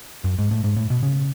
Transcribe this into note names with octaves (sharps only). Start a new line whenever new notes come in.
F#2
G#2
A2
G#2
A2
B2
C#3